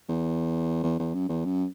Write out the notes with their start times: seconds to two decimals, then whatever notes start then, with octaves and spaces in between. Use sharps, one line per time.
0.09 E2
0.83 E2
1.00 E2
1.14 F#2
1.29 E2
1.45 F#2